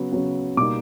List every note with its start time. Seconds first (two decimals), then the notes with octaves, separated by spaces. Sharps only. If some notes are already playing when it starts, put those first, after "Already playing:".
Already playing: C#3 F#3 B3
0.12 C#3 F#3 B3
0.57 B2 G3 A#3 D#4 D6